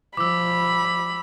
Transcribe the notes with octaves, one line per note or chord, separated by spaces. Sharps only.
F3 B5 D6 E6